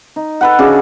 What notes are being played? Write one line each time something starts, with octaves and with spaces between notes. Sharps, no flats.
D#4
A4 B4 F#5
C#3 D4 F#4